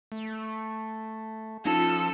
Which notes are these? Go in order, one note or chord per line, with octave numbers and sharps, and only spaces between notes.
A3
F3 C#4 D#4 F4 A4